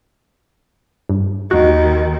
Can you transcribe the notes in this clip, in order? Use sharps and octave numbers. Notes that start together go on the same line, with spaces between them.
G2
D#2 D#3 F#4